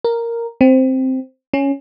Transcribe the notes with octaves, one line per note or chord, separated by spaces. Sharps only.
A#4
C4
C#4